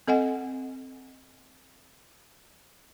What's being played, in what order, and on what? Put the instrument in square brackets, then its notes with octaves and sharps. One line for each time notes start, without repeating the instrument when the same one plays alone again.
[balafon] C4 A4 D#5 F#5 G#5